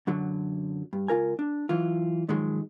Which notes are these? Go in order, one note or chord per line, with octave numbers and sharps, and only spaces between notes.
F#2 D3 F#3
G2
C#2 F4 A#4 G#5
D4
E3 F#3 F4
G#2 D#3 F3 F#3 G#3